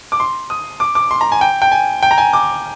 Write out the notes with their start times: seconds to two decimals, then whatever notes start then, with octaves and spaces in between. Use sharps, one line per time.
0.12 D6
0.20 C6
0.50 D#6
0.80 D6
0.95 D6
1.11 C6
1.21 A#5
1.32 G#5
1.41 G5
1.62 G5
1.72 G#5
2.03 G5
2.11 A#5
2.18 G#5
2.33 D6